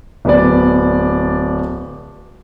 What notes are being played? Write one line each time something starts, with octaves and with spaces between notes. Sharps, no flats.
D1 B3 D5